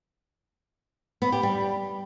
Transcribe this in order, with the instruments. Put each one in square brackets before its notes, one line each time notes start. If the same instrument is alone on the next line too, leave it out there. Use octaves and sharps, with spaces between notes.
[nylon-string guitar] B3
G4
G3